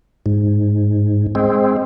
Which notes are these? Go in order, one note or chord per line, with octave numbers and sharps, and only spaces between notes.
G#2
G#3 C4